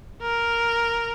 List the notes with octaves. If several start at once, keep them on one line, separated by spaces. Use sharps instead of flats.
A#4